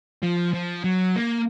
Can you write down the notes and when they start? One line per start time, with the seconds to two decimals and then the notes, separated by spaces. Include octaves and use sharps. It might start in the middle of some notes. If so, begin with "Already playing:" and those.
0.22 F3
0.54 F3
0.84 F#3
1.16 A#3